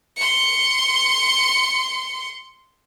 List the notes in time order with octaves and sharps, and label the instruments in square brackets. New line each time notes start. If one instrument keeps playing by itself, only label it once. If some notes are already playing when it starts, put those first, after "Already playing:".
[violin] C6 C#7